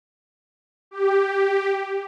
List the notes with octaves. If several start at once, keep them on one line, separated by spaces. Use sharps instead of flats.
G4